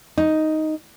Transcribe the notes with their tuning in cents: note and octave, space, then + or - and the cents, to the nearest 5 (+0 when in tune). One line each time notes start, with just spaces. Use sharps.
D#4 +5